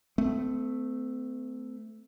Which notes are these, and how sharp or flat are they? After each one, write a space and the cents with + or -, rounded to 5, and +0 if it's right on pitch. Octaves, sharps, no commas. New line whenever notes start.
A3 +0 C4 -45